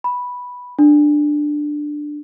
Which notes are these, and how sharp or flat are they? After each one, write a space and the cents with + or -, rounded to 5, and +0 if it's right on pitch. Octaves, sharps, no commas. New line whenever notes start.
B5 -5
D4 +10